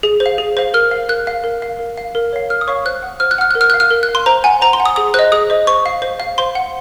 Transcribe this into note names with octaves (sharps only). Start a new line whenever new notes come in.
G#4
C5
F5
G#4
C5 F5
A#4 F6
F5
A#4 F#6
F5
A#4
F5
A#4
F5
A#4
C#5 F5
A#4 F6
D#6
C#5 F5 C#6
C5 F#6
F#5
C5 F6
F#6
F#5 F6
A#4 F#6
F6
F5 F#6
F6
A#4
F#6
F5
C6
C5 A#5
F#5 G#5
C5 A#5
C6
F#5
D#6
G#4 D#6
C5 D#5 F#6
G#4 D#6
C5 D#5
C5 C#6
F5
C5
F5
C5 C6
F#5